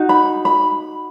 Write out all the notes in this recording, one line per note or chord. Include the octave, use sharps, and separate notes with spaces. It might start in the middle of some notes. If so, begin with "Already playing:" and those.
Already playing: D#4 F#4
B5
B5